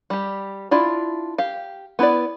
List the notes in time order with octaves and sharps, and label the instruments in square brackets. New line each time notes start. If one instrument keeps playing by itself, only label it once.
[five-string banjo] G3 G4
D4 E4 F4 D5
G4 F5
B3 E4 B4 D5